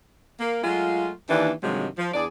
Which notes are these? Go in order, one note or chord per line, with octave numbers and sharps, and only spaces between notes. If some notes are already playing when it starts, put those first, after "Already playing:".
A#3
F#3 G#3 A3 F4
D#2 E3 D4
G2 C3 D#3 F3 F#3 G#3
F3
E2 D4 G#4 D5